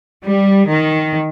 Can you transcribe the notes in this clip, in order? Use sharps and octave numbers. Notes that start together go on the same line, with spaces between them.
G3
D#3